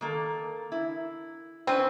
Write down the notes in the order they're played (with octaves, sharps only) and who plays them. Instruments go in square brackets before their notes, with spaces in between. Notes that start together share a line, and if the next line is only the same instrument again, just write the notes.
[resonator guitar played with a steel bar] D#3 A#3 A4
E4
[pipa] C4 [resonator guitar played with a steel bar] C#4 B4